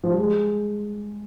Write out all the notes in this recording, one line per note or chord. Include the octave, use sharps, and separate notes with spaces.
F3
G3
G#3